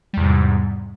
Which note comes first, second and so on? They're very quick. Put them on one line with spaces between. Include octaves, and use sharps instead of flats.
G3 E2 C3 G#2